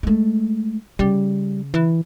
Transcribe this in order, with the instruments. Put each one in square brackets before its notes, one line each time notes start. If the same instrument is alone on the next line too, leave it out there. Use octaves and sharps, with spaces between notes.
[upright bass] G#3 A3
[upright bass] C#3 [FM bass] G3
[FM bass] E3